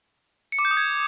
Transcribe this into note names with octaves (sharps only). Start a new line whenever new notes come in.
C#7
D6
G6
D#6
G#6